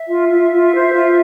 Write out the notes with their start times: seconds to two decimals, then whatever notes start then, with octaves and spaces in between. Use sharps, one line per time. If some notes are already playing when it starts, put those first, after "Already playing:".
Already playing: E5
0.09 F4
0.30 F4
0.52 F4
0.74 C5
0.94 F4